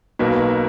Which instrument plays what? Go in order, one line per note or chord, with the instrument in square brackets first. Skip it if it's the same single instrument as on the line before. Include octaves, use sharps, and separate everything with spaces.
[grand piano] B1 B2 A#3